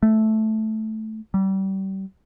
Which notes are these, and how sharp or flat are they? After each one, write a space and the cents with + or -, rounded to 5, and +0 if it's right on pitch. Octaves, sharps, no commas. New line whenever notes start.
A3 -10
G3 -30